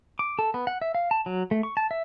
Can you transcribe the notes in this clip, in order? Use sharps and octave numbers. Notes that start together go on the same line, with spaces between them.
D6
A4
B3
F#5
E5
F5
A5
F#3
A3
C#6
A5
E5